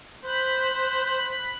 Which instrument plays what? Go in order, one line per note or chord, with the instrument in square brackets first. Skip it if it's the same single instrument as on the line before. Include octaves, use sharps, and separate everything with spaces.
[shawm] C5 [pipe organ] B5 F#6